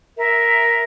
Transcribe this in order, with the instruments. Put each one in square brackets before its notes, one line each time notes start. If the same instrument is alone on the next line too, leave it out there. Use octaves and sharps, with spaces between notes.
[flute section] A#4 E5